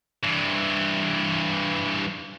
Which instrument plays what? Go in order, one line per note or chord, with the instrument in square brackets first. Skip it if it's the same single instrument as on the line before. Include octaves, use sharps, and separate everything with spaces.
[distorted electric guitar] G2 E3